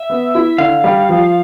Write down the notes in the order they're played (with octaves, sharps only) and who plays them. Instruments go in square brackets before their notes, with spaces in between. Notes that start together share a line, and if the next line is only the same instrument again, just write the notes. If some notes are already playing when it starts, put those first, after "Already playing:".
Already playing: [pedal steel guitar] E5
[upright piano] B3
E4
[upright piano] D3 [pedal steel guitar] F5
[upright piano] G3
F3